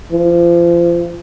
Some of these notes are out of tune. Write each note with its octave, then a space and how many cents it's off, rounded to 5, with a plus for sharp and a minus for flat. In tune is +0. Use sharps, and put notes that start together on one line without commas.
F3 -30